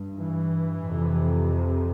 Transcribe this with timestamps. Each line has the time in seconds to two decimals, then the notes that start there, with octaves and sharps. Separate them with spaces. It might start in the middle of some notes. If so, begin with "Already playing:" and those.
Already playing: G2
0.17 E3
0.85 F2 C3